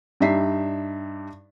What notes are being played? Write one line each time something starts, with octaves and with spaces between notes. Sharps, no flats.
G2 G3 D#4 E5 B6 C7